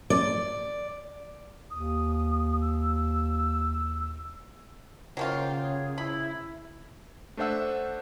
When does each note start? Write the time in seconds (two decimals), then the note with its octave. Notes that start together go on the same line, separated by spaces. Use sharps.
0.10 D5
1.71 D#2 D#6
2.61 E6
5.17 C#3 F#3 A#3 F4 G5
5.61 G#4
5.98 E4 B5
7.37 A3 D4 C5 E5 F#5 E6